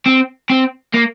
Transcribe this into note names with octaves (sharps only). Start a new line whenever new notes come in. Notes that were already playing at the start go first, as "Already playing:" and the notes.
C4
C4
A#3